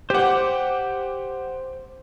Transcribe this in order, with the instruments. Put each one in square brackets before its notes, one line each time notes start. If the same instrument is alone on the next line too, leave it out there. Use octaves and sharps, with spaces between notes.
[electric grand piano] G4 F#5 [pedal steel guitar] C5 D6